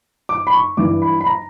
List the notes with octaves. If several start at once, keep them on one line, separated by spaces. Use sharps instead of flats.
D6
B5
C#6
G2 E3 D6
B5
B5
A#5